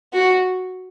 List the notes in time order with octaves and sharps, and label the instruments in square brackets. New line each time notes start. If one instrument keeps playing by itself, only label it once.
[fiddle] F#4